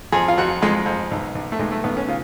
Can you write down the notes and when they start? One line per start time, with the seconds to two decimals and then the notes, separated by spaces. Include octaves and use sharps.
0.12 F2 G#4
0.28 F4
0.37 F2 F#4
0.62 F2 G#3
0.86 F2
1.11 B1
1.35 B1
1.52 A3
1.59 B1 G#3
1.72 A3
1.84 B1 B3
1.97 C#4
2.08 C#3 F4